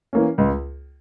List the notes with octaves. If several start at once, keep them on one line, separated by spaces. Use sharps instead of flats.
E3 A#3 C#4
C#2